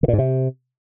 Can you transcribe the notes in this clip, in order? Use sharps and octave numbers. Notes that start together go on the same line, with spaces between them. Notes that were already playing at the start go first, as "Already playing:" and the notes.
D3
A#2
G#2
C3